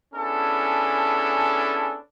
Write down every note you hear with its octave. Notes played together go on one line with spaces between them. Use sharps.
B3 C#4 D4 E4 G#4 A4